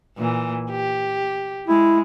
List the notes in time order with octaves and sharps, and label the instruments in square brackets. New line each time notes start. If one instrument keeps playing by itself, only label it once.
[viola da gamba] A#2 E3
G4
[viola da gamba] G#3 [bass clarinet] E4